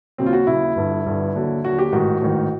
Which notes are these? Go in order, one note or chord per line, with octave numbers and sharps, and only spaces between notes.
D#2 C#3 F#3 C4
F4
F#4
D#2 C#3 F#3 E4
G1 G2 D3
G1 G2 D3
D#2 D3 F#3
D#2 D3 F#3 F#4
G4
A1 G#2 D#3 F#4
A1 G#2 D#3